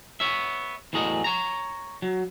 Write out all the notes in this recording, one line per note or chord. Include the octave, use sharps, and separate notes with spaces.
B3 C#5 E5
E2 A2 F#3 G#4 D#5
C#5 A#5
F#3